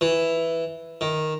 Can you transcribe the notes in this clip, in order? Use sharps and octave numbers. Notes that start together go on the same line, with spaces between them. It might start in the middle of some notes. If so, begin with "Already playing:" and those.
E3
D#3